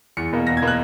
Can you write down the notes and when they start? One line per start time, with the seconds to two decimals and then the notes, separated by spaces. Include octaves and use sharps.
0.17 E2 C#7
0.33 B2 A#3
0.47 E2 A#6
0.57 G#6
0.62 B2 A#3
0.68 F#6